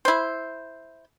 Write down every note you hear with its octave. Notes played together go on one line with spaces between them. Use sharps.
E4 C5